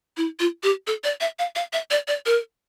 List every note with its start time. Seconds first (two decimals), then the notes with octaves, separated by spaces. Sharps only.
0.17 E4
0.40 F4
0.63 G4
0.87 A4
1.04 D5
1.21 E5
1.39 F5
1.55 F5
1.73 E5
1.91 D5
2.08 D5
2.26 A#4